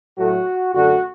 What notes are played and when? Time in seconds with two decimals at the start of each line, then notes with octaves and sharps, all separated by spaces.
0.17 A2 F#3 A3 F#4
0.73 F#2 D3 A3 F#4